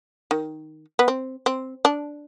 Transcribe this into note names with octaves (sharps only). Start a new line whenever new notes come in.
D#3
B3
C4
C4
D4